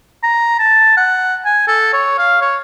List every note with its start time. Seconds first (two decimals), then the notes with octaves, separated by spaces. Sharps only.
0.24 A#5
0.59 A5
0.97 F#5
1.45 G#5
1.68 A4
1.93 C#5
2.19 F5
2.42 C#5